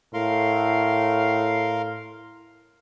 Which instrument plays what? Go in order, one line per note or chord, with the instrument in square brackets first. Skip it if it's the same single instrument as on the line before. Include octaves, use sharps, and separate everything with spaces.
[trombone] A2 [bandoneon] A#4 F5 C6